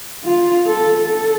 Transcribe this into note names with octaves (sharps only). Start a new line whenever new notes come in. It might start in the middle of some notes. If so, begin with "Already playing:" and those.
F4
A4
A4